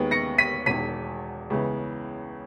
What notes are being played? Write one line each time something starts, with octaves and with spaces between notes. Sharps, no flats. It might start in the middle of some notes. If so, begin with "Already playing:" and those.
Already playing: D#2 D#3 G#3 B3
A#6 C#7
B6 D#7
E1 E2 D#3 B6 D#7
C#2 C#3 E3 G#3 B3